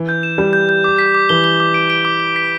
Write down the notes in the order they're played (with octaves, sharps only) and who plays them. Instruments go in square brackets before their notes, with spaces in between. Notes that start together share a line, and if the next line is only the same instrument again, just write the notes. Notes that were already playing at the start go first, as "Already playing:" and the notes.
Already playing: [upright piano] E3
[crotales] G6
E7
[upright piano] G3 [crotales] G6
[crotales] G6
G6
D6
B6
D6
[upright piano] E3 [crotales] G7
[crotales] G7
D6
D7
D7
D6
G7
B6